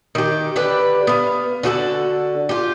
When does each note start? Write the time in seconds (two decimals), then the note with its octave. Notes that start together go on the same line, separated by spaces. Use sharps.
0.15 D#3 G4
0.56 D3 G4 B4 D5
1.07 B3 F5
1.63 D3 F#4 G4 A4
2.49 F4 G4